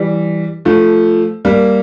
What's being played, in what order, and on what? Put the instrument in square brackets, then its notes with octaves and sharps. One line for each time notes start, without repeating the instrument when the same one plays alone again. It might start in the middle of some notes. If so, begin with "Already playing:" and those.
Already playing: [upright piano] E3 G3
F3 A3
G3 A#3